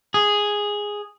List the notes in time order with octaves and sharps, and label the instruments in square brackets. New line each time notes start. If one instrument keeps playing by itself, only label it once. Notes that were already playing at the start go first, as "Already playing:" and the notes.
[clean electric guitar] G#4